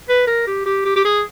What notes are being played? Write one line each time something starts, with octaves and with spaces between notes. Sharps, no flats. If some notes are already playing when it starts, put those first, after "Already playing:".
B4
A#4
G4
G4
G4
G4
G#4